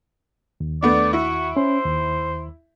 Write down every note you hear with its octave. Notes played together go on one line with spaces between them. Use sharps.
D#2
A3 B3 D4 D5
E4 F#4 E5
C#4 C5
D#2